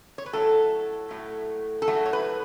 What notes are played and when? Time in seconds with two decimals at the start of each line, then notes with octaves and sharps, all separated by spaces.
0.18 C#5
0.26 B4
0.33 A2 F#3 A3 A4
1.10 A2 F#3 A3
1.82 A4
1.88 A2 F#3 A3 F#4
2.06 C#5
2.13 B4